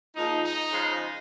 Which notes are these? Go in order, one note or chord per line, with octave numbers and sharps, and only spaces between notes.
A#2 F3 G#3 D#4
D#4
C#3 F3 G#3